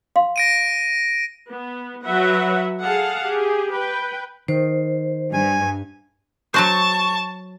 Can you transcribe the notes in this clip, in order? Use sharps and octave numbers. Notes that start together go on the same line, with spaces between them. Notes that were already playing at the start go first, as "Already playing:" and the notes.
F5 C6
A#6 D7 D#7
B3
F#3 B4 E5 F#5
G#4 A4 F5 F#5 A5
G4 G#4
B4 G5
D#3 C5
G2 G#5
F#3 F#4 C5 A5 C#6